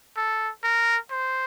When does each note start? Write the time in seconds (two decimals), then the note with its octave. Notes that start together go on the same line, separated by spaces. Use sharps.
0.17 A4
0.64 A#4
1.11 C5